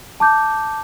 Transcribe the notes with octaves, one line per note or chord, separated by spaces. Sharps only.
A5 D6 G6